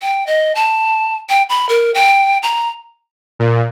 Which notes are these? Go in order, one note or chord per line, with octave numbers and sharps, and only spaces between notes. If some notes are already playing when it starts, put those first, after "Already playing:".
G5
D#5
A5
G5
B5
A#4
G5
A#5
A#2